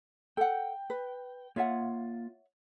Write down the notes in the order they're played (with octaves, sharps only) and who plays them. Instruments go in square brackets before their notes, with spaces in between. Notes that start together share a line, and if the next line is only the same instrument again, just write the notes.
[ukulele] A4 F#5 [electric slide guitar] G5
[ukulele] B4
[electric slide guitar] A#3 F4 [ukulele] C#5 E5 F#5